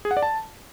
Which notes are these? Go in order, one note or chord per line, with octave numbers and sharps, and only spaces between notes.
G#4
F#5
D5
A5